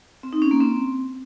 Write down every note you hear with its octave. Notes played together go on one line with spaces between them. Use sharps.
C4
D#4
C#4
A#3
C4